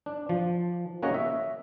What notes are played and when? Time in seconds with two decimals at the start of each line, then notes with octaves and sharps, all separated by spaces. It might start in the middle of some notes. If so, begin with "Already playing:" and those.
0.06 D4
0.29 F3
1.03 A#3 C#4 F#4 G#4 D#5 F#5
1.14 E5